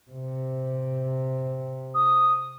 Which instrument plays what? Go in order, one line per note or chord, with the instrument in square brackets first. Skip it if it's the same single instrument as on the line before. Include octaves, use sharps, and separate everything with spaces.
[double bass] C3
[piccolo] D#6